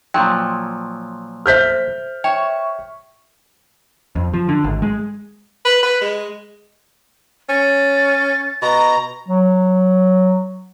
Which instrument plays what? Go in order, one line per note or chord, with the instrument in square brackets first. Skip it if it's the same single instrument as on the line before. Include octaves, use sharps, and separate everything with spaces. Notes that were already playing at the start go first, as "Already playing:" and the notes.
[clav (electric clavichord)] A#2 F3 F#3 [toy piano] G5 C6
[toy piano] A4 C5 E5 [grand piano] F6 G6 B6
[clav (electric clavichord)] C#5 [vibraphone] E5 C#6 [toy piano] G5
[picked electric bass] F2
F3
D3
G#1
G#3
[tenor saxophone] B4
B4
G#3
[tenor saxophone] C#4 [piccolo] A6
[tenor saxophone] B2 [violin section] A#5
[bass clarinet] F#3